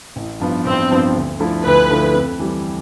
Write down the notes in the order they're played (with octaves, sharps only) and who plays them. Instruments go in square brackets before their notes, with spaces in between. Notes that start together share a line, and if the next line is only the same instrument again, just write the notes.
[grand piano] A1
G2 F3 B3
[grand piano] A1 [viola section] C4
[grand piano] G2 F3 B3
D2
D3 F3 A3 E4
[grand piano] D2 [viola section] B4
[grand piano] D3 F3 A3 E4
F2
E3 G3